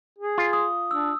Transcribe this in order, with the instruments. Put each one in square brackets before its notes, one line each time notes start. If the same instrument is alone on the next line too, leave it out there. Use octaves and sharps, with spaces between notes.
[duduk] G#4
[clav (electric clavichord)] F4
[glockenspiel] D#6
[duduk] D4 [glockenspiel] E6